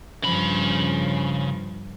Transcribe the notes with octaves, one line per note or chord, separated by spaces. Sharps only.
G2 C#3 F3 B5